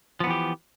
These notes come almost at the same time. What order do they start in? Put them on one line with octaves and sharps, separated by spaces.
F3 B3 E3 G4